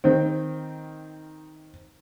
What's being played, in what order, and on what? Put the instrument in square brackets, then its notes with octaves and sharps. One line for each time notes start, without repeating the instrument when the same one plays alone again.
[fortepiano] D#3 C4